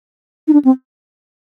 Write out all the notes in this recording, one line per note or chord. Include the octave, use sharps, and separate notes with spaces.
D#4
D4
C4